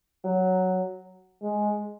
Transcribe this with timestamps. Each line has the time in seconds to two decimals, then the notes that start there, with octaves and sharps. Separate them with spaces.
0.24 F#3
1.42 G#3